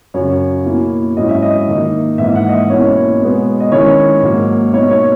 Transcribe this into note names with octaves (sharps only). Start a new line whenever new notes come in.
F#2 C#3 F#3 C#5
B2 A#3 E4
G#2 F#3 C#4 E4 D#5
E5
D#5
D#3 A#3 D#4
G#2 E3 A#3 D#4 E5
F#5
D#5
E5
B2 A#3 C#4 E4 C#5
B2 G#3 B3
D#5
D#3 G#3 C#4 E4 C#5
G#2 F#3 A#3
B2 A#3 D#4 C#5
C#5